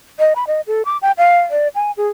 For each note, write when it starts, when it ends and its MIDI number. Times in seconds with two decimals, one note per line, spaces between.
0.19 0.33 75
0.36 0.44 83
0.47 0.61 75
0.67 0.82 69
0.85 0.97 86
1.02 1.12 79
1.18 1.38 77
1.51 1.68 74
1.75 1.91 80
1.97 2.09 68